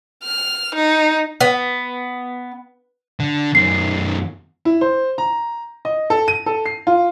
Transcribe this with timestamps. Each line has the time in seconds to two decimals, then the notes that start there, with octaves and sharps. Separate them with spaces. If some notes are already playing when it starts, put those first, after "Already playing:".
0.23 F6
0.75 D#4
1.41 B3
3.20 D3
3.55 F#2 D#3 C7
4.65 E4
4.81 C5
5.18 A#5
5.85 D#5
6.10 A4
6.28 D#7
6.46 A4
6.66 C7
6.87 F4